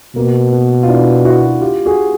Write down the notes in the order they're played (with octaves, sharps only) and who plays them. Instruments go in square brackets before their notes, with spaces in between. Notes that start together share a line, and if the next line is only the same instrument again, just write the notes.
[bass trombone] B2 [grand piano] A#3
[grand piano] B3
F4
D4 E4
E4 F#4
F4 G4
F#4 G#4